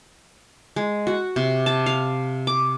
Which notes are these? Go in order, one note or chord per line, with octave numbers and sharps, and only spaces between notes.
G#3
F#4
C3
A5
F5
D6